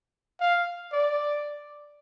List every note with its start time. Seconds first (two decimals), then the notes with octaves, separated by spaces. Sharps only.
0.40 F5
0.92 D5